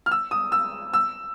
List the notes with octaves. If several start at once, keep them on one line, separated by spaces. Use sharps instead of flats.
F6
E6
D#6
E6
E6